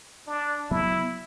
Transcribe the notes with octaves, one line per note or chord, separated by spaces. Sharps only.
D4
C#3 F#3 B3 E4